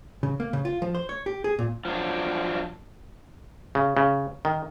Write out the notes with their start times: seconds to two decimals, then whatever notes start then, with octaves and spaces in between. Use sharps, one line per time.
0.23 C#3
0.40 A#3
0.53 C#3
0.65 F4
0.82 F3
0.95 C5
1.09 C#5
1.26 G4
1.44 G#4
1.59 A#2
1.85 F3 F#3 D4
3.75 C#3
3.97 C#3
4.45 D#3